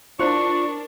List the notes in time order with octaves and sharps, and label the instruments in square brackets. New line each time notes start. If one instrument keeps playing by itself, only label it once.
[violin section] D4 A#4 [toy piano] E4 C5 C6 [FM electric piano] F4 [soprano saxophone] C#6